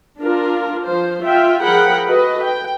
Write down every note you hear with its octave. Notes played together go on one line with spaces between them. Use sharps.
D4 F4 A#4
F3 C5
F4 E5 G5
F3 G#4 A#4 F#5 G5 B5
F#4 A4 B4 D#5
G5